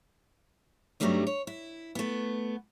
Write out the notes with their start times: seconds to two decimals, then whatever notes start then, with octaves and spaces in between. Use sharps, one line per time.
1.00 G2 C3 F#3 G3 A3 D#4
1.27 C#5
1.47 E4
1.95 A3 B3